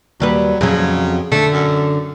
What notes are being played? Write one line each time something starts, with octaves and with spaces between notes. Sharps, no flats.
D#2 F#3 G3 B4
F2 C#3 F#3
D3 A3
F#2